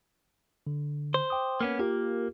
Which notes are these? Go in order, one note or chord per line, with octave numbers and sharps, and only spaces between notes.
D3
C5
G5 D6 D#6
A#3 B3 C#4
A#3 F4 G4 A#4